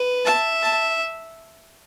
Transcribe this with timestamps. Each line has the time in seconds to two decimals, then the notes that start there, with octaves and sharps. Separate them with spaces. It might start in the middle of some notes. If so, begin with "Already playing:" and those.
Already playing: B4
0.25 E5 A5
0.62 A5